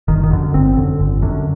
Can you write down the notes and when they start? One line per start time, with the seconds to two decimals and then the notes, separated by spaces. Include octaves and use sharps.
0.08 G1 D#3
0.23 D#3
0.31 F#2 D3
0.54 G1 C4
0.77 F#2 D3
0.99 G1
1.22 F#2 D3